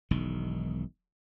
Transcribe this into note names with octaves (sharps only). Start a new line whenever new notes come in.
E1 B1 D#3